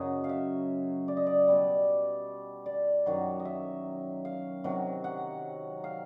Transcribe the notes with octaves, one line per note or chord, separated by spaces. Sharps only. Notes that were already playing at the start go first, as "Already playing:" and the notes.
Already playing: F#2 C#3 F#3 D#5
F5
E5
D5
D#5
D5
B2 G3
D5
F#2 D#3 F#3
D#5
E5
F5
C3 D#3 F#3
F#5
F5